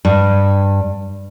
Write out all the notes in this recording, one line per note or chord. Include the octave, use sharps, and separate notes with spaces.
G2